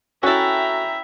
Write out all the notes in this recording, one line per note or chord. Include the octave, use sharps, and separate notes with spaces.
C#4 E4 F#4 A4 E5 G5 A#5